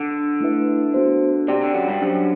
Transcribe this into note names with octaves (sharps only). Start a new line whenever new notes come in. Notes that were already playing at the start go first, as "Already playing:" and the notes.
Already playing: D3
A3 E4 B4 E5
B3 F#4 C5
C3 G4 D5 G5
D3
F#2 F#3
G2 G3
F#2 F#3 D4 G4 C5